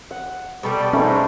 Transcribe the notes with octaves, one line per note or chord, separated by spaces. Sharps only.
F#5
B2 G3 A4 D5
G#2 A3 C#4 B4